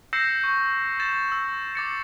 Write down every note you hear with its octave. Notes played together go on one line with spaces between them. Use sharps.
E6 G6 A#6 C7 C#7 E7
C#6 G6
G6 A6 E7
E6
D6 A6 C#7